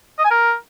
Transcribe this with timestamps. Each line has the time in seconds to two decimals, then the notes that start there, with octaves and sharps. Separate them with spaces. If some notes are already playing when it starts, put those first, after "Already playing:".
0.18 D#5
0.24 G#5
0.31 A#4